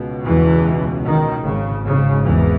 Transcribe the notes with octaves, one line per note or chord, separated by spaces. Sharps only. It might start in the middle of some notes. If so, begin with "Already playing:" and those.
Already playing: C#2 B2
E2 E3
D#3
G#1 G#2 C#3
C#3
E2 E3